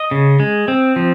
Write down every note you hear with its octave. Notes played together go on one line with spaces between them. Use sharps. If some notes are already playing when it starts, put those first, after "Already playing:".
Already playing: D#5
C#3
G#3
C4
F3